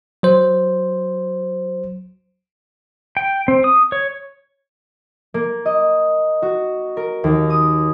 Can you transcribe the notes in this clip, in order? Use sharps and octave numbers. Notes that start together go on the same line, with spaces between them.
F#3 C5
G5
C4
D#6
C#5
A#3
D#5
F#4
A#4
D#2
D#6